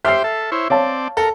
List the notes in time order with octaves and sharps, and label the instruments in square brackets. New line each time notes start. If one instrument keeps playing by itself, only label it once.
[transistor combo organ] G4 C5 [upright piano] E5 [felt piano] F6 C7
[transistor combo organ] A4
E4 C5 C#5
[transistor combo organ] C4 D5 [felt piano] C#5 F5 A5
[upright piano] A4 [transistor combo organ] A#4